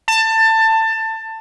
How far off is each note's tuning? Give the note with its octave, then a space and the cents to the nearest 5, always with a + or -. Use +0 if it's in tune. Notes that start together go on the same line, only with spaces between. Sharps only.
A5 +20